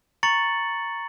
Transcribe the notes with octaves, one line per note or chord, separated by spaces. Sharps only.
A#5 C#6 A6 C#7 F#7